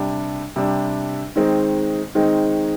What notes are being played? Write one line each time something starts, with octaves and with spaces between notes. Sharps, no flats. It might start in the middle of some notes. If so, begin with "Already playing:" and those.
Already playing: C3 G3 D4
C3 G3 D4
D#3 G#3 C4 D#4
D#3 G#3 C4 D#4